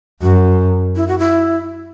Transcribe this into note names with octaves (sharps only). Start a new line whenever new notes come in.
F#2 F#4
E4
F#4
E4